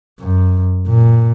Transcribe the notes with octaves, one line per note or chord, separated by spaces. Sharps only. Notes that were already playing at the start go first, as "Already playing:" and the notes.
F#2
A#2